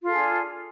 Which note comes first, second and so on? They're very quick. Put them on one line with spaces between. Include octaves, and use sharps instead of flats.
F4 A4 G#4 D4